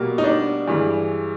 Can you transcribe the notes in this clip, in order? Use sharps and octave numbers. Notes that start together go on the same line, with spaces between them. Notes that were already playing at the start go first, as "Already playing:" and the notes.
Already playing: B2 G3 A#3
D#4
D4
G2 E3 G#3